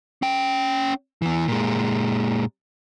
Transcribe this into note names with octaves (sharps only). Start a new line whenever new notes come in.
C#4 G5
E2 E3
A#2 G#3